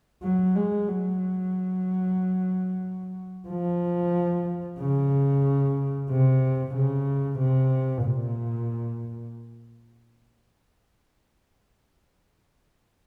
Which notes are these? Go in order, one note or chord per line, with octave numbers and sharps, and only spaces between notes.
F#3
G#3
F#3
F3
C#3
C3
C#3
C3
A#2